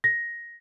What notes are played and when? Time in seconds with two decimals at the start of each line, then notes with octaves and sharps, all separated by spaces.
0.04 A#6